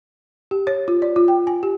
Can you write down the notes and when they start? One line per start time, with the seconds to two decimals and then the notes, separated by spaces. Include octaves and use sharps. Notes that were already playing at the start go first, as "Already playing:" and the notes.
0.51 G4
0.67 C#5
0.88 F4
1.02 D5
1.16 F4
1.28 G5
1.47 G#5
1.63 G4